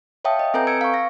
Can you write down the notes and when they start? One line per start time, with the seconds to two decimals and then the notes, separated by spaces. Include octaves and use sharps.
0.25 C#5 E5 F5 G5 A5 D#6
0.39 D#5
0.54 C4 A4 B4 G#5 A#5 G6
0.67 E6 G#6 C#7 D7
0.81 F5 C#6
0.94 A#6